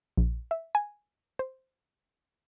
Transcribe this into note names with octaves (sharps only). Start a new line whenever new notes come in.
A#1
E5
G#5
C5